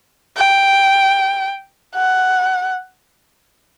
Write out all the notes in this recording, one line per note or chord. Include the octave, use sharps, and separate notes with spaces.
G5
F#5